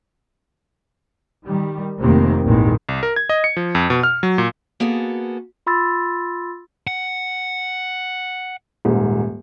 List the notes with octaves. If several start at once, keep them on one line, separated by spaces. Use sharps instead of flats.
D#3 G3
F1 C3 D#3 A#3 C4
A#1 E2 G#2 D#3 G#3
C2
A#4
G#6
D#5
C#7
F3
F2
B2
F6
F#3
A#2
A#3 B3 F#4 G#4 A4
F4 B5 C6 E6 A6
F#5
D#1 G#2